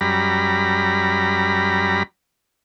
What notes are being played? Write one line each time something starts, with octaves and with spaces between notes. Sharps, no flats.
F#2 G3 A#5 B5